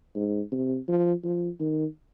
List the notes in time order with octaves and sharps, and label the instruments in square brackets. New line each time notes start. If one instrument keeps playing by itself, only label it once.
[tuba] G#2
C3
F3
F3
D#3